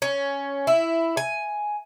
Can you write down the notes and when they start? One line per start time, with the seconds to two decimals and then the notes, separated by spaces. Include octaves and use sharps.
0.02 C#4
0.67 E4
1.17 G#5